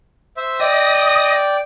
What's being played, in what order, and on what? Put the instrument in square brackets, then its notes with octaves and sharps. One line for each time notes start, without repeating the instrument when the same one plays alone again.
[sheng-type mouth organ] C5 E5
[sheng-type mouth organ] D5 G5 [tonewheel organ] D#5 D#6 A#6